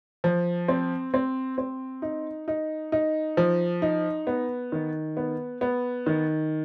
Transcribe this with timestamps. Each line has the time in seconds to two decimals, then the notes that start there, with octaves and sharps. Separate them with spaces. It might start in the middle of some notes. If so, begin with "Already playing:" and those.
0.24 F3
0.68 C4
1.14 C4
1.58 C4
2.02 D#4
2.48 D#4
2.92 D#4
3.37 F3
3.82 D#4
4.27 B3
4.72 D#3
5.17 B3
5.61 B3
6.06 D#3